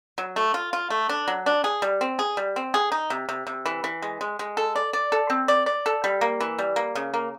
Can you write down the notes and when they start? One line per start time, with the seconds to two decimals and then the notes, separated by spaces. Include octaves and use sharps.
0.18 F#3
0.36 A3
0.54 F4
0.73 F4
0.90 A3
1.09 D4
1.28 F#3
1.46 D4
1.64 G#4
1.82 G3
2.01 C4
2.19 G#4
2.37 G3
2.56 C4
2.74 G#4
2.92 D#4
3.10 C3
3.29 C3
3.47 C3
3.66 E3
3.84 E3
4.02 G#3
4.21 G#3
4.39 G#3
4.57 A4
4.76 D5
4.93 D5
5.12 A4
5.30 C4
5.48 D5
5.66 D5
5.86 A4
6.04 G3
6.21 A#3
6.41 E3
6.59 G3
6.76 A#3
6.95 C#3
7.14 A#3